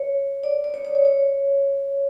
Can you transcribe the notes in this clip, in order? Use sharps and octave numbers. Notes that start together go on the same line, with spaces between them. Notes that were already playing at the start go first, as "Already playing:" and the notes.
Already playing: C#5
D5
D5
C#5
C#5
C#5
C#5